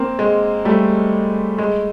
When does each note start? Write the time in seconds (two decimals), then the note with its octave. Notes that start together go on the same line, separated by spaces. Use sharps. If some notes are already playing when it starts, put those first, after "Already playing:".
Already playing: A#3 C4
0.19 G#3
0.65 G3 A3
1.58 G#3